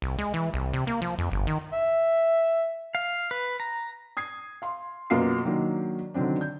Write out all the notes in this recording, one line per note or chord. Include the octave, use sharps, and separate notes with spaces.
C2
G#3
E3
C2
C3
A#3
F3
F2
G1
D#3
E5
F5
B4
A#5
D#6 G#6 C7
F5 C6
F#2 B2 A#3 F4 F#4 C7
D#3 F#3 A#3 D4
D3 D#3 F#3 C4 D4
G6